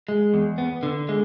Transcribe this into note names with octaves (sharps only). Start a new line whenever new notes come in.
G#3
E2
B3
D3
G#3